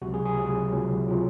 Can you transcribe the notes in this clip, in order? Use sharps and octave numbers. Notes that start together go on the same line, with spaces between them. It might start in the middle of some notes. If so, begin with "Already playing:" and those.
C#2 C3 F#3 F#4
G#4
G#4
C#2 C3 F#3
C#2 C3 F#3
C3 F#3 F4